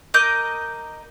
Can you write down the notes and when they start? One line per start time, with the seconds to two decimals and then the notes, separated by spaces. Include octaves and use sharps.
0.14 A#4 D#5 D6 G6